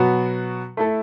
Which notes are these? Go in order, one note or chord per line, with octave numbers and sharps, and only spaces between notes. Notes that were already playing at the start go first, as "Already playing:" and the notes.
Already playing: B2 F#3 B3 F#4
A3 E4 A4